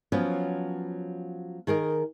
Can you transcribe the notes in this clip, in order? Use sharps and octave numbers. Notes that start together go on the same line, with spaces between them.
F3 F#3 B3 C#4
D#3 G#4 A#4 D#5